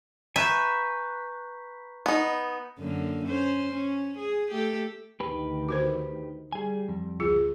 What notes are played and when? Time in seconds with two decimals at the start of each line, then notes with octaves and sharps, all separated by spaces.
0.36 B4 E5 G#5 A#5 C#6 G6
2.06 B3 D#4
2.78 F#2 D3 A#3
3.26 C#4 C5
3.73 C#4
4.18 G#4
4.50 A3 G4 A4
5.20 D2 D#3 G4 B4
5.69 F#4 A#4 C5
6.52 G3 G#4 G#5
6.89 F2
7.20 C#2 F4 G#4